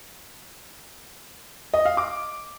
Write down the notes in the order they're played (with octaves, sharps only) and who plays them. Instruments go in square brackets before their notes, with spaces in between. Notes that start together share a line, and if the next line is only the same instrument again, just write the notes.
[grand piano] D#5
F5
D6